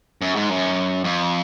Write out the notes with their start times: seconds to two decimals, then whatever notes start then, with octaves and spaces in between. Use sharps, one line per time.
0.22 F#2
0.36 G#2
0.49 F#2
1.04 F2